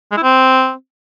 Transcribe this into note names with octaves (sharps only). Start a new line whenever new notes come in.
G#3
E4
C4